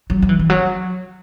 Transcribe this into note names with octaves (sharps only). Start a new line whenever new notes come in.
F#3
F#3
E3
E3
F#3